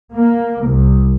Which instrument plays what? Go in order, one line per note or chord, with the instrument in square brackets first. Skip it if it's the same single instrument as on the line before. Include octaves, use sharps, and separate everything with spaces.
[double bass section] A#3
C2